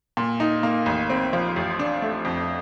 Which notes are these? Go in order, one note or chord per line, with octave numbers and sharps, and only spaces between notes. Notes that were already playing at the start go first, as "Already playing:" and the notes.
A#2
D#4
A#3
A1
C4
F3
A1
D4
A3
F2